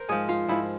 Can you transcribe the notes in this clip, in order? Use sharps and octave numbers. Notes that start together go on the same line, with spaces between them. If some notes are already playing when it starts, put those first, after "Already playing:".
Already playing: A#4 C5
G#2 F3 G#4
F4
G#2 F3 E4